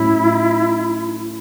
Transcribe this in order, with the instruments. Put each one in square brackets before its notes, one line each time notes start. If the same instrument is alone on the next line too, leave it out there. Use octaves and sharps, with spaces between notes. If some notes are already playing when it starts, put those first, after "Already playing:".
Already playing: [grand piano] A2 F#3 C#4 [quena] E4